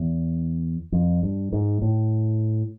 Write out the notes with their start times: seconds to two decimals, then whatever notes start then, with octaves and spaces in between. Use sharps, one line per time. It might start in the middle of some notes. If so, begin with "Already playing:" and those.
Already playing: E2
0.92 F2
1.23 G2
1.53 G#2
1.82 A2